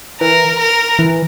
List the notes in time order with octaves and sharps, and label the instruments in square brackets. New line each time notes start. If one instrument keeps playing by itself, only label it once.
[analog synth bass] E3 [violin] A#4
[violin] A#4
[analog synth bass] E3